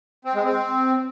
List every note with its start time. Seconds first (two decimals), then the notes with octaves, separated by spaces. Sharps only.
0.25 C4
0.34 G#3
0.44 C4